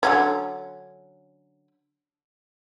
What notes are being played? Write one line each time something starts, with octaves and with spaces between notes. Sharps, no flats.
D3 F#3 C#4